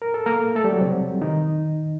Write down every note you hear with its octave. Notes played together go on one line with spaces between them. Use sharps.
A#4
A4
A#3 A#4
A3 A4
G3 G4
F#3 F#4
C3 C4
D#3 D#4